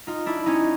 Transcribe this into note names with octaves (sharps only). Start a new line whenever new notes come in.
D#4 F4
D4 E4
C#4 D#4